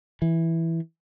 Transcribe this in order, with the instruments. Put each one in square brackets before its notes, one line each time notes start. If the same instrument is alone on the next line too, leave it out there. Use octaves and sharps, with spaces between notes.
[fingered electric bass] E3